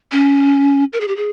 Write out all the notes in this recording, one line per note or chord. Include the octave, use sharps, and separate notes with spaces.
C#4
A#4
G#4
G4
G#4